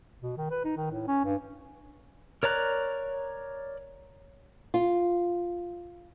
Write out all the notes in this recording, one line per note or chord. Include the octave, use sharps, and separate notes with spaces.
B2
D#3
B4
D#4
D#3
A2
C#4
G2
A#4 C#5 D5 A#5 F#6
F4